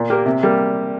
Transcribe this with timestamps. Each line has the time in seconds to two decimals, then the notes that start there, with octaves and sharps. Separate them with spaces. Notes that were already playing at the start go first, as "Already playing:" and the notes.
Already playing: A#2
0.10 A#3 G4 A#4
0.26 C3
0.43 G3 A#3